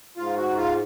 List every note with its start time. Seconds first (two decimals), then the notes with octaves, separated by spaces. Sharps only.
0.17 G#2 F4
0.37 F#4
0.57 F4